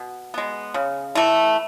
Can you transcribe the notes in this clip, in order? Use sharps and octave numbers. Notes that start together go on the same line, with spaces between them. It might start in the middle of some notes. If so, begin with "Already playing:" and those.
Already playing: B2
G#3 B3
C#3
E3 A3